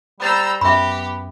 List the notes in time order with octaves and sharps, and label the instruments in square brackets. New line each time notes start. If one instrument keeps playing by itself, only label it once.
[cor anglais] G3 [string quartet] C5 A#5 E6 [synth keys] B5 A6
[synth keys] F#2 [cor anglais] B3 [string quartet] G4 [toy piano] E5 B5